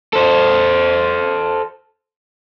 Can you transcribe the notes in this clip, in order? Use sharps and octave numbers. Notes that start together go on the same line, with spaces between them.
A4 C5